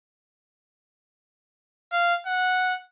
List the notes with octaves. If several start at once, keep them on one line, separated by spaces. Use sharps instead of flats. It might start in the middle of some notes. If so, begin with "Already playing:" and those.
F5
F#5